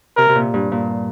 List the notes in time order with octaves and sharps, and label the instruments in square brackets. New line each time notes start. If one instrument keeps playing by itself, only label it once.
[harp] C3 [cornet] A#4
[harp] C3
A#2
G2
A#2